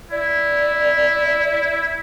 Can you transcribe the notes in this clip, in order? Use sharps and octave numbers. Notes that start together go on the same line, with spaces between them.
E4 D5